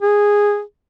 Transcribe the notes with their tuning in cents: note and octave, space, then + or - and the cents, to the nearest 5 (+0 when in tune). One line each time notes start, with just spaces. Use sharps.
G#4 -10